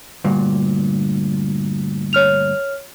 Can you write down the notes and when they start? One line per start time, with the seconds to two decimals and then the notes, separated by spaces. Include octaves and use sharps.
0.24 D2 G2 A#2
2.13 C#5 F6 F7